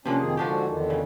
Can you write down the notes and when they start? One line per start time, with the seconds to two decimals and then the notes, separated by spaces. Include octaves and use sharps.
0.05 C3 F3 A#3 C#4 D4
0.19 F2 D#3 G#4
0.37 G#2 D3 F3 D4 F#4 G4
0.68 E2 D3 D#3
0.90 C#3